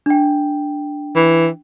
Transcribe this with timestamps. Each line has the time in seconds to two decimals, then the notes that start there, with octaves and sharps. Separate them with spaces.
0.06 D4 G5
1.16 E3